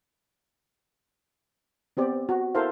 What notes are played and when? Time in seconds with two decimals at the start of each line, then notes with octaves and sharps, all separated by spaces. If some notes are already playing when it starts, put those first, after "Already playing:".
1.97 B3 C4 G4 D5
2.29 F#4
2.55 E4 A4 A#4 C5 F5